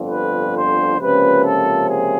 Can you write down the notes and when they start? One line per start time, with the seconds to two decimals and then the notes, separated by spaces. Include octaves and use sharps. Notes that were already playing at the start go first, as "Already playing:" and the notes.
Already playing: G1 F2 D3
0.10 B4
0.54 C5
0.99 C#2 C3 F3 A#3 C#4 B4
1.44 A4
1.88 G#4